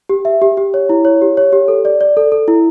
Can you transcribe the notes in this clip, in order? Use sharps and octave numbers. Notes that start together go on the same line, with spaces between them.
G4
E5
G4
G4
C#5
E4
C#5
G4
C#5
G4
A4
D5
D5
A4
A4
E4